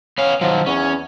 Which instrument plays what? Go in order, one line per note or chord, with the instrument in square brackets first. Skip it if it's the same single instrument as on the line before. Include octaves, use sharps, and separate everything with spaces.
[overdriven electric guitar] B3 F5 [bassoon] C#4
[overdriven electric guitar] D#3 F#3 [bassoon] F3
[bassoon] E2 [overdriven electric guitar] C#4